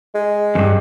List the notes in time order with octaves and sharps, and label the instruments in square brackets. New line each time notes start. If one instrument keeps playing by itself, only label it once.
[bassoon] G#3
[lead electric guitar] E2 G2